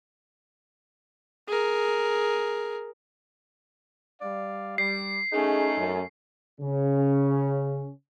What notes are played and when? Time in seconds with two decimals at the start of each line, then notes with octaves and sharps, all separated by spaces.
1.47 G#4 A#4
4.21 G3 D5 F5
4.78 G3 C7
5.33 A3 C#4 D#4 G#4
5.78 F#2
6.61 C#3 C#4